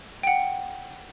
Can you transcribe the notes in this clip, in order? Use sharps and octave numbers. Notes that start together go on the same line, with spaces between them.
F#5 G5